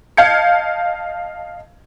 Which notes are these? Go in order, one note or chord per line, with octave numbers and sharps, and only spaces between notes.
D#5 F5 A5 G6 G#6 C#7